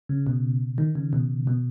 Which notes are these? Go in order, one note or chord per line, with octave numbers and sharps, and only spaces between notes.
C#3
B2
D#3
C#3
B2
B2